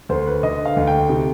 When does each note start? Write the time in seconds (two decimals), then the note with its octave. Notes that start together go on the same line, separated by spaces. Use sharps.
0.09 D2 C5
0.27 B4
0.43 D3 D#5
0.66 F5
0.77 D2
0.87 G5
1.09 C3